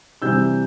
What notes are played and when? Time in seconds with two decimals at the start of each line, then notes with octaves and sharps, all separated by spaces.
0.22 C3 E3 G3 E6 G6